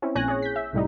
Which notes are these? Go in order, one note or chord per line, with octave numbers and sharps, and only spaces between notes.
C4 C#4 E4
A#1 A#2 C#5 G#5 F#6 A#6
G#4 C#5
G6 B6
E5
C2 A2 G3 D#4